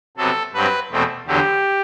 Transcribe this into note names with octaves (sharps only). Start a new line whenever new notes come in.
C3 F#3 B3 A4
G2 F#3 C4 B4
E2 B2 A3 C4
E2 D3 F#3 G4